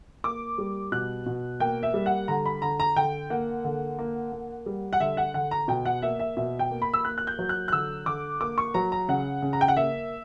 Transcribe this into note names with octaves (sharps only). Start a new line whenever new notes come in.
A#3 D6
G3
B2 F#6
B2
A#3 G5
E5
G3
F#5
D3 A#5
B5
D3 A#5
A#5
D3 G5
A#3 F#5
D3
A#3
A#3
G3
F#5
D3 E5
F#5
D3 F#5
A#5
B2 G5
F#5
A#3 E5
E5
B2 E5
G5
A#3
B5
E6
A#3 F#6
F#6
G6
F#3
F#6
F#6
D3 E6
D3 D6
A#3 D6
C#6
F#3 A#5
A#5
C#3 F#5
C#3
A#5
G5
F#5
A#3 E5